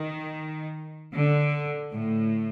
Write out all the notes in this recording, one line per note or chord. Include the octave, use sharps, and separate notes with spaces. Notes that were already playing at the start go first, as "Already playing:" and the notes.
Already playing: D#3
D3
A2